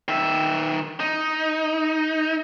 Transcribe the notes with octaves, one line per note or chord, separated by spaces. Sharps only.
D#3 E5
D#4